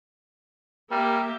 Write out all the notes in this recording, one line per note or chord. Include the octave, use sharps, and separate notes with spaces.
G3 A#3 G4 A#4 E5